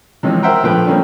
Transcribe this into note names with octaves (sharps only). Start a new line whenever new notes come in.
C3 E3 F3 G#3 C#4
A#4 C5 E5 F#5 G5 A#5
A#1 F3 A3 B4 G5
F3 G3 A3 A#3 C4 C#4